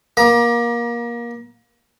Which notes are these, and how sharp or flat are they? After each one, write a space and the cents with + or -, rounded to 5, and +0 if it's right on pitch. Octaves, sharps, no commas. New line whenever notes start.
A#3 +25 A#5 +35